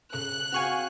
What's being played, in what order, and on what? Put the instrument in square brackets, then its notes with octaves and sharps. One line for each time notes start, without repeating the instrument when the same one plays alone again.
[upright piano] C#3 A4 [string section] F#6
[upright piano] C4 F5 [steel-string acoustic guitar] F#4 G#4 G5 [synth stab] G#5 C#6 F6